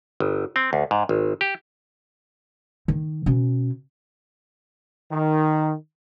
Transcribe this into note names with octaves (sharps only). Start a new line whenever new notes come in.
G1
C4
D2
G#2
G#1
G4
D#3
B2 C#4
D#3